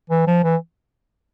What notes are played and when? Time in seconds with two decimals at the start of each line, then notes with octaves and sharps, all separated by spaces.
0.10 E3
0.27 F3
0.44 E3